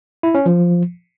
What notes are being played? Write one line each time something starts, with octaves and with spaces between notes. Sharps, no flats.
E4
C#4
F3